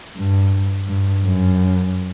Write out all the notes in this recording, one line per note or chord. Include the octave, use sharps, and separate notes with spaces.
G2
G2
F#2